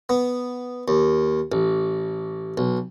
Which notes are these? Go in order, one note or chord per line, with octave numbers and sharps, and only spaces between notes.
B3
D#2
A1
B1